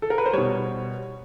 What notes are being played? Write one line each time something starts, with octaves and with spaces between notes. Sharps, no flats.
A4
A#4
B4
C5
B2 G3 C#5